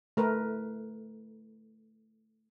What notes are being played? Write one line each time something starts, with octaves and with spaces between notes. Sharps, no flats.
A3 A#4 B4